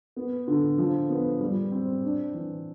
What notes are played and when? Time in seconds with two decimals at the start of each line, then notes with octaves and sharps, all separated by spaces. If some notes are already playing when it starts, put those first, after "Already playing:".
0.16 B3
0.47 D3
0.78 F3
1.09 B3
1.41 G3
1.72 C4
2.03 D4
2.34 E3